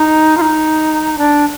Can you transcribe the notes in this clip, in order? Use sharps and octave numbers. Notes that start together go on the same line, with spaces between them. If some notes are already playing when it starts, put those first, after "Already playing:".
Already playing: D#4
F4
D#4
D4